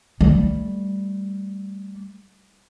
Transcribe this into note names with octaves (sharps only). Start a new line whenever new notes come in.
G3 A3